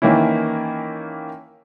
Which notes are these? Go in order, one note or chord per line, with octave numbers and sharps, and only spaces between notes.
D#3 E3 A#3 C#4 E4